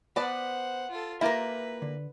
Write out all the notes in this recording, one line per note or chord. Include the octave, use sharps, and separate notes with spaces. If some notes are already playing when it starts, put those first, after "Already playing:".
B3 B4 C5 D5 F#5 A5
F4 A4
A#3 E4 F4 G4 A#4 B4 E5
D3